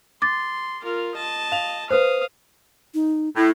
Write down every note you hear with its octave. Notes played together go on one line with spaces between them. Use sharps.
C6 D6 A6
F4 A#4
D#5 A5
F5 F7
B4 C5 F5 D#6
D#4
A2 E4